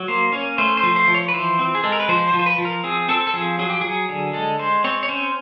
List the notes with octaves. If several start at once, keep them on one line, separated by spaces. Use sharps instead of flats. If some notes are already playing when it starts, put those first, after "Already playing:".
Already playing: F#3
A#3 C5
C#4 C#5
A3 C5
C5
F3
C5
F3
C#5
B4
E3 C5
C4
G#4
G#3 A4
A#4
B4
F3 C5
C5
F3
C5
B4
F3
A#4
C4 G#4
C4 A4
A4
F3 G#4
F#3 G#4
G4
F#3 G#4
D3
G#3 A4
G#3 C5
C4 C#5
C#5
C#4 C5